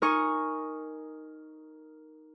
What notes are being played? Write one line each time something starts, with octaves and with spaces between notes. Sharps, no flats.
D#4 A#4 D#5 G#5 C#6